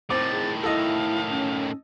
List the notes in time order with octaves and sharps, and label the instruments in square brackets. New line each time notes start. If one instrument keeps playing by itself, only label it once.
[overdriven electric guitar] A2 D#3 [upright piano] C4 D6 [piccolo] A6
[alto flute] G#4
[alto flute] E4 [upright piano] A4 D#5 [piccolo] F5
[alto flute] C#4